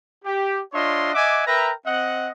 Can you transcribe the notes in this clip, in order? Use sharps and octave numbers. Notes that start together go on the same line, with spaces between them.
G4
D4 F4 C#5 D#5 E5 C6
D#5 E5 F#5 G#5 D6
A#4 B4 E5 G5 A#5
C4 D#5 F#5